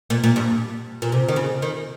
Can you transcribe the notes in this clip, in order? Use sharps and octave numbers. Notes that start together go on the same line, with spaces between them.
A#2
A#2
G2
A#2
C3
D#3
C#3
D#3